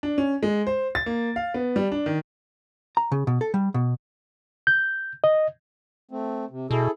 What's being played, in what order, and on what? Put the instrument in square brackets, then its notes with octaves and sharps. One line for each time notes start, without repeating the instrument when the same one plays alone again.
[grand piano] D4
C#4
G#3
C5
A6
A#3
F5
B3
G3
D4
D#3
[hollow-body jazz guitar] A#5
C#3
B2
A4
G3
B2
[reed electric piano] G6
D#5
[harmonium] A3 C4
C3
[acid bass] B2 [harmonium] E4 G#4 A4